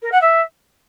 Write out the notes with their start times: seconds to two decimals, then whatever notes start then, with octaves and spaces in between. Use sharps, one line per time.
0.02 A#4
0.12 F#5
0.22 E5